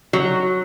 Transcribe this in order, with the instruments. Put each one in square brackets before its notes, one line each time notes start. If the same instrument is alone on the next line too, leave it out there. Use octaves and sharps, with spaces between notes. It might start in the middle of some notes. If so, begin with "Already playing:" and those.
[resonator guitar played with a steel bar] F#3